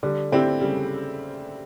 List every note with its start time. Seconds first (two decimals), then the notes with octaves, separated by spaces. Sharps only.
0.03 D3 G3
0.32 D3 C4 E4 G4
0.61 C#3 G3